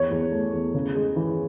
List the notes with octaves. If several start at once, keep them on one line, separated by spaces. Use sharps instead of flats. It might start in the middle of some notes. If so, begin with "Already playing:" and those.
Already playing: E2 C#5
E2
A3
E2
C#3
G#3
E3